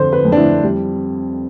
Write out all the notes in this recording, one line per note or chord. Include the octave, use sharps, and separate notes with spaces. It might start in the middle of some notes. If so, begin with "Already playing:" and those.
Already playing: F2 D3 C5
B4
F2
D4
E4
G3